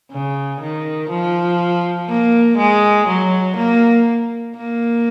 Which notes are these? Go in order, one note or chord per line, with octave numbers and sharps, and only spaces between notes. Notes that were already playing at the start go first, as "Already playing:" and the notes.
C#3
D#3
F3
A#3
G#3
F#3
A#3
A#3